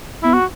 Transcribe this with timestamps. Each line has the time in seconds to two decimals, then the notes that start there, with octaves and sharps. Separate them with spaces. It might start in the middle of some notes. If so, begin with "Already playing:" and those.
0.23 B3 E4
0.34 F#4